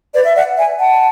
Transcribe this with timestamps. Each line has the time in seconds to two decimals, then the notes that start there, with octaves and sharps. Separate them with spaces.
0.13 B4 D5
0.25 E5
0.35 D5 F#5
0.57 E5 G#5
0.80 F#5 A5